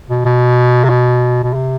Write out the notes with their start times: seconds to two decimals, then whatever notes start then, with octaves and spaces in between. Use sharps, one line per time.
0.10 B2
0.25 B2
0.84 C3
0.90 B2
1.43 B2
1.54 C3